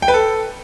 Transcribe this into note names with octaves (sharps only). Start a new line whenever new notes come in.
G5
B4
A4